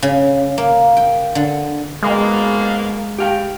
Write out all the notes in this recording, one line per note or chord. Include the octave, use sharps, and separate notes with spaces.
C#3
A#3
G5
D3
G#2 B2 G#3 A#3
G4 F5 G5